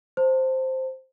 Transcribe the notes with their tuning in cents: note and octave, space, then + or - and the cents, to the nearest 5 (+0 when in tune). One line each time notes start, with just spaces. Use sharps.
C5 +0 A5 +35